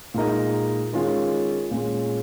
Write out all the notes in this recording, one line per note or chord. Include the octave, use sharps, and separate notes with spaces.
A#2 G#3 D#4 A#4 D#5
D#3 G#3 C#4 F4
A#2 G#3 C#4